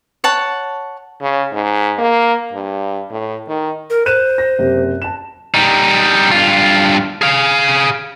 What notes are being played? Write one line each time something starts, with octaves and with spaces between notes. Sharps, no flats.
C#5 F#5 A5
C#3
G#2
A#3
G2
A2
D#3
A#4
C5 F#6 D#7 E7
A#6
F#1 C3
A5 E7
G3 D#4
G2 F4
G#4 F5